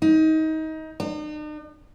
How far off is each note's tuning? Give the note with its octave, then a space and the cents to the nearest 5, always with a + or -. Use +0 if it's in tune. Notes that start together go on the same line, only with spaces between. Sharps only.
D#4 +25
D#4 -45